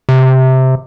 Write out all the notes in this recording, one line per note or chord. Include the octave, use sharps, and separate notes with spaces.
C3